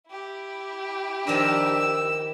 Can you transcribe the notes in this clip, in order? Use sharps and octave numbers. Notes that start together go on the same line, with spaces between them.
E4 G4
D#3 F3 D4 A#4 E6